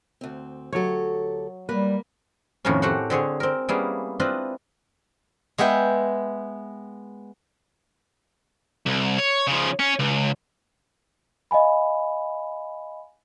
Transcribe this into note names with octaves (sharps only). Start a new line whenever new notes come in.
D2 C4
D2 F#3 G4 A4 C#5
G3 A#3 B4
F2 A2 D#3 A#3 C#4
A3 F#4 G4 C5 F#5
D3 C4 G#4 C#5
C4 A#4
G3 A#3 B3 C#4 E4 G#4
C4 D4 E4 F4 B4 D#5
G#3 B3 E5 G5
C2
C#5
C#3 F3
C#4
C#2
D#5 F5 G#5 B5